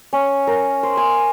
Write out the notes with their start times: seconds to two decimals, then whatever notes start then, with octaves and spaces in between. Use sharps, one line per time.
0.13 C#4
0.47 A#4
0.83 C5
0.97 G#5